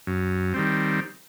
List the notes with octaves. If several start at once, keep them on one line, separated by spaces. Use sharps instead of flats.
F#2
D#3 G3 C4